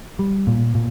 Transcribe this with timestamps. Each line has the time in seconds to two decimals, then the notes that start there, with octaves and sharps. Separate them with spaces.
0.19 G3
0.47 A#2
0.75 A#2